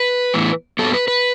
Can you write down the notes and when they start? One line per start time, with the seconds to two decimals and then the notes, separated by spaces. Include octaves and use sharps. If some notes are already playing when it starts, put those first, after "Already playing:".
Already playing: B4
0.34 A2 E3 B3
0.79 G2 F#3 B3 A4
0.94 B4
1.08 B4